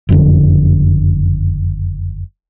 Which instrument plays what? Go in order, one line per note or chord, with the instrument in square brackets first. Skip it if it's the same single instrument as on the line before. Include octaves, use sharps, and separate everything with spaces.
[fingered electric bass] F#1 F2 D3